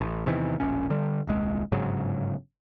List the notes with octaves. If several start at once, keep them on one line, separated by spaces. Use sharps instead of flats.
A1
E2 C3 D#3 E3
E1 A#1 C#4
D3 G3
D#1 C2 G#3
G1 G#2 C#3 F#3